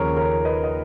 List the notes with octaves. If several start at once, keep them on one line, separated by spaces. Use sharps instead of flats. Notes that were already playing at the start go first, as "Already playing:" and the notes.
Already playing: D#2 C#3 F3 G#4 A#4 C#5
A#4 C#5
B4 D#5
D#5